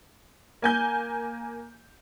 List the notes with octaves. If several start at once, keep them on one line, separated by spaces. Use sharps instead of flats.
A#3 G#5 G6